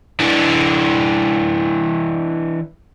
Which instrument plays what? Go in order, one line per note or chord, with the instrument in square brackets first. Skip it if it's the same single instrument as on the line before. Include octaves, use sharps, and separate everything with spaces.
[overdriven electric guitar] E3 D4